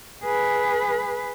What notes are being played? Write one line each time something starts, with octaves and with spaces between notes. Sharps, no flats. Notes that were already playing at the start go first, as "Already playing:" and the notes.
G#4 B4